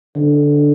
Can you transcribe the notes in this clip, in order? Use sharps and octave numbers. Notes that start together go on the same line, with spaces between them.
D3